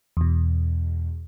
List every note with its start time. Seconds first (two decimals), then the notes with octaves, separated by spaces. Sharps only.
0.17 E2 B2